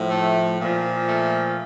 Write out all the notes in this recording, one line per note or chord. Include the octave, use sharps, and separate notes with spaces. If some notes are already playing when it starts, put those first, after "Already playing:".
Already playing: A2 F3
A3
A#2 F3
A3